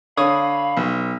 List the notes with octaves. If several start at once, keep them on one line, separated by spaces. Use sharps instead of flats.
D3 C#5 F5 B5 D#6
B1